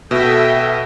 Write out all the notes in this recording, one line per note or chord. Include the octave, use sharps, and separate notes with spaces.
B2 A4 E5 G5